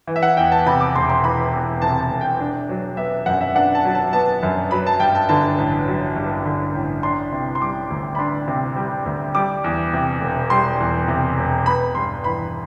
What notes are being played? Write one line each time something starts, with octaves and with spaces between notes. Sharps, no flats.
E3
E5
F#5
E2 G5
A5
C3 B5
D6
E1 C6
C6
E3 B5
E2
C3 A5
A5
E1
G5
D4
F#3
B3 E5
F#2 F#5
E5
D4 F#5
A5
F#3
A5
B3 A5
F#2
F#3 B5
A5
G2 G5
A5
D3 A5
A1
F#3
G2
D3
A1
D4 C6
C3
C6
G3 D6
D2
B5
D4 C6
C3
G3
D2
G3 D6
E2
C3
E1
G3 C6
E2
C3
E1
B3 B5
G2 C6
E3 B5